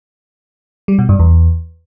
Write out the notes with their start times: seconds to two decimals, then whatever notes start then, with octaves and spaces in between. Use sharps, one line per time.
0.88 G3
0.99 B2
1.09 G2
1.19 E2